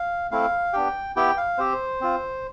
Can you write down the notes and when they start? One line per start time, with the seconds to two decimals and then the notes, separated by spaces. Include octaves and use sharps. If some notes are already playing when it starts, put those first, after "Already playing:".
Already playing: F5
0.31 A3 C4 E4 F5
0.73 B3 D4 G4 G5
1.16 B3 E4 G4 G5
1.37 F5
1.58 C4 G4 C5
2.01 C4 F4